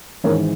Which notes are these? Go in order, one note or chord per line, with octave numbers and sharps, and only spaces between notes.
G#1 G#2 E3 A#4 C#5